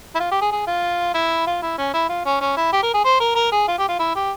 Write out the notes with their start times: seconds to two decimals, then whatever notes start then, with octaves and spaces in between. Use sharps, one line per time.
0.15 E4
0.20 F4
0.31 G4
0.41 G#4
0.52 G#4
0.67 F4
1.15 E4
1.47 F4
1.62 E4
1.78 C#4
1.94 E4
2.09 F4
2.26 C#4
2.41 C#4
2.57 E4
2.73 G4
2.83 A#4
2.94 G#4
3.05 C5
3.20 A#4
3.35 A#4
3.52 G#4
3.68 F4
3.78 G4
3.89 F4
3.99 E4
4.15 G4